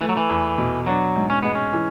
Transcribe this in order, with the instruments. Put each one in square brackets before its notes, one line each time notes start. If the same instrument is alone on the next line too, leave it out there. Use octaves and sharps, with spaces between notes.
[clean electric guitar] E3 [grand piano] A3
[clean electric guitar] F#3
E3
[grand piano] E2
B2
[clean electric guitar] F#3 [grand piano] D4
[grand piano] G#2
[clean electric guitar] C#4
[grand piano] G#3 [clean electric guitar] B3
[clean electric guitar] C#4
[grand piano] E3